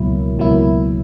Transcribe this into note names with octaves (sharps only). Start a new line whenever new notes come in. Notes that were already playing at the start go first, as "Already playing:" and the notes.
Already playing: C#2 B2 F#3 A#3 E4
C#2 B2 F#3 A#3 E4